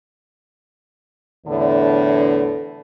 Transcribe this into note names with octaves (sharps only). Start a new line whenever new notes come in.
E2 A2 D3